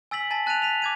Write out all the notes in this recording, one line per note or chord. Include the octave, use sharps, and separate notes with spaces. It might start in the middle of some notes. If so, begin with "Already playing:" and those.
G#5 E6 A6 B6 F#7
G#5 A5 A6 B6
A5 F#6 A6 B6 D#7 F7
B6 D#7 F7
D6 G#6 D#7